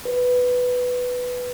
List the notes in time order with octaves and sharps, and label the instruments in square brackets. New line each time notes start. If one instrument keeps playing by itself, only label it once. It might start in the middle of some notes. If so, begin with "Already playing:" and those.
[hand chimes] B4